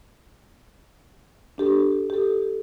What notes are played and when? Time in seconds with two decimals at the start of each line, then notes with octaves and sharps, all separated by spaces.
1.58 D4 G4 A4
2.10 G4 A4